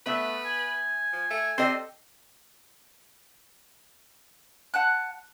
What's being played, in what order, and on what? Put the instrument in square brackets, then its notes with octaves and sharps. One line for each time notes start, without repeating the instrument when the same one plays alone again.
[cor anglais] A3 [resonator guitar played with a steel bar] B3 E5 [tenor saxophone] B4
[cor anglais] G#5
[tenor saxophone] F3
A3
[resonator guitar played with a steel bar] C4 G4 D#5 [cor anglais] A4 [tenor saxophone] C5
[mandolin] F#5 A5 F#6